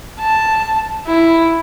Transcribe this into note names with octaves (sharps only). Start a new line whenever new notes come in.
A5
E4